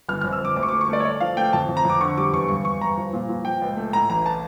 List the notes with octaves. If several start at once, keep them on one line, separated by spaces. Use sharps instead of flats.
G1 F6
F2 F6
E6
G1 D6
D2 D6
C#6
D6
A3
C#6
A3 D5
C#5
A3 D5
F3 F5
A3 G5
F2 A5
F2
A#5
F2 D6
D3 C#6
G3 D6
E2 C#6
G2 C#6
G2 C#6
G2 A#5
F3
A#2
A#2
F3 G5
C#2
A3
A2 A#5
A1 A#5
A5